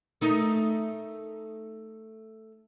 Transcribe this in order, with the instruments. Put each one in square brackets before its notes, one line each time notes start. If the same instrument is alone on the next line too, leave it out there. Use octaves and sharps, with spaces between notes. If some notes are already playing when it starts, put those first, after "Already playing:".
[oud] A3 D#4 A#4